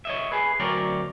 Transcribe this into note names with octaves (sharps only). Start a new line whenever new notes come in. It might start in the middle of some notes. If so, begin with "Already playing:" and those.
C#5 D#5 E5
G#4 B4
D2 F#3 C4 A#4 C#5 D5